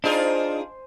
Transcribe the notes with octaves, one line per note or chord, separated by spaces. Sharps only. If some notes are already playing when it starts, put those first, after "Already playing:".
D4 D#4 F4 G#4 C5 D#5 G#5